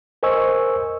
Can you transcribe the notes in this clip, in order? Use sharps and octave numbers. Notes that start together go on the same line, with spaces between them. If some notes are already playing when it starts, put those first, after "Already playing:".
A#4 C5 D#5 G#5 C#6 E6